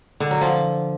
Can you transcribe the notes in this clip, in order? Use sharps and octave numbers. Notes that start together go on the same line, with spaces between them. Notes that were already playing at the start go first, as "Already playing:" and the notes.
D3
F#3
F3